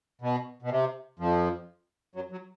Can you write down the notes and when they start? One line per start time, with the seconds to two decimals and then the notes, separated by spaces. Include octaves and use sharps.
0.21 B2
0.62 B2
0.70 C3
1.19 F2 F3
2.15 F#2 F#3
2.32 F#3